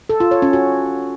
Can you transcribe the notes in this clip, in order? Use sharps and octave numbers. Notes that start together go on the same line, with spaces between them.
A4
F4
C#5
C#4
F#4